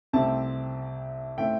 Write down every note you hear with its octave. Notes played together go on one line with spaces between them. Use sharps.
C2 C3 A3 C4 A5
A2 A3 C4 G5